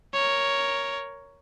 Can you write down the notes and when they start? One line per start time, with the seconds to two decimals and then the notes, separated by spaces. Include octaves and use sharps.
0.13 A#4 C#5